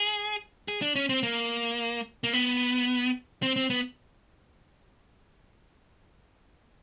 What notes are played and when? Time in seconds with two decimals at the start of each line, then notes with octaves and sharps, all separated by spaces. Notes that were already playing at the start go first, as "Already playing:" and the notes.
Already playing: G#4
0.68 G#4
0.82 D4
0.96 C#4
1.09 C4
1.23 A#3
2.24 A#3
2.33 B3
3.42 C4
3.56 C4
3.70 B3